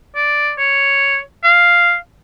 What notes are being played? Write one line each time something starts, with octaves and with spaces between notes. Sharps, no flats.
D5
C#5
F5